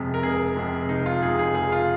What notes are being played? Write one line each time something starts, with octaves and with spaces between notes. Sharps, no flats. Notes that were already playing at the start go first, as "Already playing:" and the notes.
Already playing: F1 F2 C3 G#3
A#4
F1 G#4
F2 C3 G#3
F1 D#4
F4
F2 C3 G#3 G#4
G#4
F1 G#4
F4